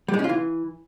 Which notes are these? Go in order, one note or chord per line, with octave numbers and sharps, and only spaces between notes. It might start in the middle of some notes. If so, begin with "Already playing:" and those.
G3
G#3
C#4
F4
E3